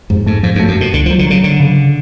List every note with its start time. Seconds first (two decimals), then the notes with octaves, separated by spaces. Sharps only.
0.10 F2 G#2
0.26 G#2 A3
0.43 G#2 F3
0.56 F#2
0.60 A3
0.68 F#2
0.77 B2 A3
0.94 C#2 D3
1.06 F3
1.11 F#3
1.19 D3
1.27 C#3 F#3
1.44 D3 F#3
1.60 C#3